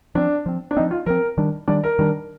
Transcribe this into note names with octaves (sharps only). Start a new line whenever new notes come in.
F3 C4 D4
F3 C4
D4
F3 C4 D#4
F4
F3 C4 A#4
D#3 G3 D4
D#3 G3 D4 D5
A#4
D#3 G3 D4